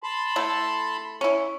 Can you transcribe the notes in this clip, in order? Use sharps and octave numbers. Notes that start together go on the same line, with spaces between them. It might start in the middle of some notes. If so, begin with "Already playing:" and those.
A5 B5 C6
A3 E4 A4
C#4 E4